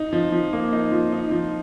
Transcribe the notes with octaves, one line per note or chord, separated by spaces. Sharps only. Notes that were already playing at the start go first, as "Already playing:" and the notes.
Already playing: D#4
F3
F3
A#3
D#4
F3
D#4
F3